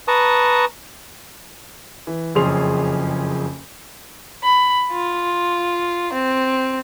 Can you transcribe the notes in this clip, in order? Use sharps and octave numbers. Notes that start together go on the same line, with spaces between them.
B4 A5 A#5 C#6 D#6
E3
F#1 F2 C#4 G#4 C6 F7
B5
F4
C4